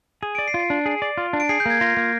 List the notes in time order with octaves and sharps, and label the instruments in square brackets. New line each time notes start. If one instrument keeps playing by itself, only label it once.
[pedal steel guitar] G#4 [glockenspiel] D#7
[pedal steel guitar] D5 [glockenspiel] D7
[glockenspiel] C7
[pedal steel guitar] F4
[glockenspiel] D7
[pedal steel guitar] D4
G#4
D5
F4
D4
[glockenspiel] D7
[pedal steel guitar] G#4 [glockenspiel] C7
[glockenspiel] G6
[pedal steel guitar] A#3 [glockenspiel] G#6
[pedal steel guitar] F4 [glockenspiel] A#6
[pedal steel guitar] A#3